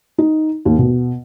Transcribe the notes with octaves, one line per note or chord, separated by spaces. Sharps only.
D#4
D#2
B2